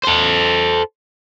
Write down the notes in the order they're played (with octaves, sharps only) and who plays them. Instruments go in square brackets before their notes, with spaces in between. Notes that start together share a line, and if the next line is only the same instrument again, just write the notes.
[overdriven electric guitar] A4 C5